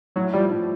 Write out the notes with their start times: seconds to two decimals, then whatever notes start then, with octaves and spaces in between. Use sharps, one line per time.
0.16 A2 F#3
0.33 F3 G3
0.51 A2